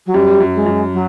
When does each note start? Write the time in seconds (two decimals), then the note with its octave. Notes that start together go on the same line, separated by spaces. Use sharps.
0.06 F#3
0.14 F#2 G3
0.40 F#2
0.54 G#3
0.66 F#2
0.93 F#3